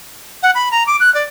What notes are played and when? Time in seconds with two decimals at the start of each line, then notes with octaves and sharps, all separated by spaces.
0.43 F#5
0.55 B5
0.71 A#5
0.87 D6
1.00 F#6
1.15 D5